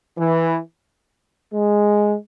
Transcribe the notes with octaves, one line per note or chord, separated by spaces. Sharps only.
E3
G#3